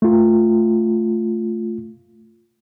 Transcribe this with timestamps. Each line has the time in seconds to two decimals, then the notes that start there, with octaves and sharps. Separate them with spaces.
0.02 A3 F4